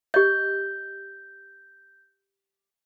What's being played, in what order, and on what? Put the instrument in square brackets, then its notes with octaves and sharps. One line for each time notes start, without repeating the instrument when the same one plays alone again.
[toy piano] G4 D#5 [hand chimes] G6